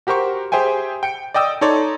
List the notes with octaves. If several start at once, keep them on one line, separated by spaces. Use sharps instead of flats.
F#4 G4 A#4 C5 C#6
G4 G#4 C5 E5 G5 G#5
G5 C#7 D7
D5 D#5 G5 D#6 E6
D#4 A4 C#5 D5 C6